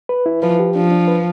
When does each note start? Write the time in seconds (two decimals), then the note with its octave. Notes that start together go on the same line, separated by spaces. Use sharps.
0.09 B4
0.26 E4
0.42 F3 B4
0.59 G4
0.76 F3 D4
0.91 D4
1.08 B4